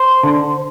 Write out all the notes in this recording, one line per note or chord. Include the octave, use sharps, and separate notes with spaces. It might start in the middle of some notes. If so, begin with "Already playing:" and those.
Already playing: C5
D3